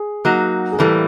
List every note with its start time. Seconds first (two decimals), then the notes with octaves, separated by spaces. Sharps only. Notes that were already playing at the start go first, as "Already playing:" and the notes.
Already playing: G#4
0.25 F#3 A#3 D#4 F#4
0.72 G#4
0.79 A2 E3 G3 A#3 A4